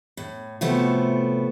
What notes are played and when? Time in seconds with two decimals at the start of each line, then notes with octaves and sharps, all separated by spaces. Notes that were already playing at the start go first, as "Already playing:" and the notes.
0.17 A2
0.61 A2 C3 F3 A3 B3 F#4